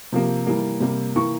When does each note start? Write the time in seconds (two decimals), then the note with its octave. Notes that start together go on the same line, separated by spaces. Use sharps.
0.12 C3 F3 A#3
0.47 E3 G3 A#3
0.80 C3 G3 A#3
1.16 E3 A#3 C#6